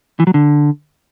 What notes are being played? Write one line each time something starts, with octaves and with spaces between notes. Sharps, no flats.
E3
F#3
D3